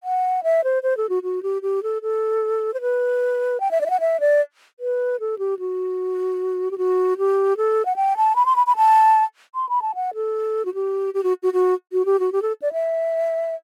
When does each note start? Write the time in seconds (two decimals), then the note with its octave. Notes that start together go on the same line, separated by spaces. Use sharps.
0.04 F#5
0.43 E5
0.64 C5
0.83 C5
0.97 A4
1.09 F#4
1.23 F#4
1.43 G4
1.62 G4
1.83 A4
2.02 A4
2.74 C5
2.81 B4
3.60 G5
3.71 E5
3.81 D5
3.86 E5
3.90 F#5
4.00 E5
4.20 D5
4.80 B4
5.20 A4
5.39 G4
5.59 F#4
6.71 G4
6.78 F#4
7.18 G4
7.57 A4
7.85 F#5
7.96 G5
8.17 A5
8.36 B5
8.46 C6
8.56 B5
8.67 B5
8.76 A5
9.55 C6
9.69 B5
9.82 A5
9.95 F#5
10.14 A4
10.65 F#4
10.74 G4
11.14 G4
11.23 F#4
11.43 F#4
11.53 F#4
11.93 F#4
12.06 G4
12.20 F#4
12.32 G4
12.42 A4
12.62 D5
12.73 E5